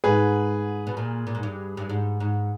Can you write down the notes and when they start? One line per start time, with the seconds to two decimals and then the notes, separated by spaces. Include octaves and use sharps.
0.04 G#2 G#4 B4
0.87 B2
0.97 A#2
1.27 A#2
1.35 G#2
1.43 G2
1.77 G2
1.89 G#2
2.20 G#2